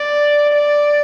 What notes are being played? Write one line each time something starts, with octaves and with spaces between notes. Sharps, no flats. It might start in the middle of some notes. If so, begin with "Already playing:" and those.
Already playing: D5
D5